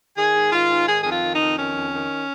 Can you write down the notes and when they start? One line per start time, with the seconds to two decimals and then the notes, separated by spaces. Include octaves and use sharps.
0.16 D#3 G#4
0.34 G#2
0.51 D#3 F4
0.69 G#2
0.87 D#3 G#4
1.02 F2 G#4
1.10 F4
1.22 D#3
1.34 D#4
1.40 F2
1.57 D#3 C#4
1.75 F2
1.93 D#3